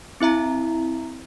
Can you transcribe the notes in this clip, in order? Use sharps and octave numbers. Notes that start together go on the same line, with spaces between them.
C4 E4 E5 A#5